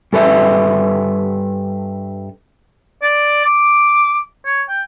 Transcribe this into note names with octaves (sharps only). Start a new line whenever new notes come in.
G2 A4 B4 E5
D5
D6
C#5
G5